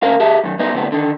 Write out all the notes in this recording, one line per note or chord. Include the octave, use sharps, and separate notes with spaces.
D2 C#4 A#4 F5
G4 G#4 E5 A5
F#2 D#3
G2 B3 D#4
D2 A2 C3 B3
D3 D#3